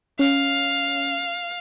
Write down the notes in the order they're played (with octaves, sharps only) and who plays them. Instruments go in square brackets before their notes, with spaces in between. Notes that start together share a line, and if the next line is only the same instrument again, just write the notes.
[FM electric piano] C#4 [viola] F5